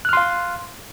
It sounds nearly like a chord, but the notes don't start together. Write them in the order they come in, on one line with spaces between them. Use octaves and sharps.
F#6 F6 C6 F5